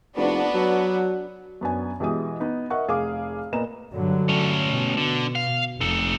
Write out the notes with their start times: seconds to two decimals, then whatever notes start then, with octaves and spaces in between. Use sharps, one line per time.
0.17 F1 B3 D4 F#4
0.54 F#3
1.61 F#2 B3 D4 G#5
2.00 B2 E3 G#3 G4 G#5 D#6
2.40 B3 D#4
2.70 A#4 D#5 E5 F#5 C#6
2.88 F1 G#4 F5 D6
3.53 A#2 A#4 B4 D#5 A#5 E7
3.92 G2 D3 F#3
4.29 A3 C#4
4.66 B2
4.97 D3
5.35 F5
5.81 F1 D#4 A4